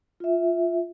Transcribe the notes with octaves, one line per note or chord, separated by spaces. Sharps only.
F4 E5